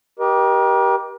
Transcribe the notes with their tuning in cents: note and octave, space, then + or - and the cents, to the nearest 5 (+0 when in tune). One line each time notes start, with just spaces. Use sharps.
G4 -5 A#4 +40 D#5 +0